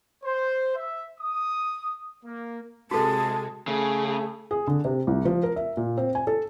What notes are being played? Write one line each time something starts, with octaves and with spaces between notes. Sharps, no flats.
C5
E5
D#6
A#3
C3 G#3 F#4 A4 A5
C#3 A3 G#4
G#4
D3
C3
C2
F3
A#4
E5
A#2
C4
G#5
A4